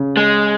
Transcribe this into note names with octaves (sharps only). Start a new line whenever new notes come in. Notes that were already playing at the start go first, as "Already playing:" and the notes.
Already playing: C#3
G#3